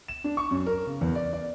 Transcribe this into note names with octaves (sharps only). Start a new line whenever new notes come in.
E7
D4
C#6
F#2
A#4
C#3
E2
D5
D5